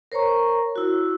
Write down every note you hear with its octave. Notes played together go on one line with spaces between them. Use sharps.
A#4 C5 C#5 A#5 C#6
E4 F#4